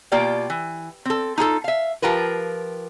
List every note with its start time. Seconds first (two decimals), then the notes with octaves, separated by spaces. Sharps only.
0.12 B2 A#3 F4 G4 D5 G5
0.50 E3
1.05 C4 A4
1.38 D#4 F4 G#4 A4
1.64 E5 F5
2.02 F3 F4 G4 A#4 B4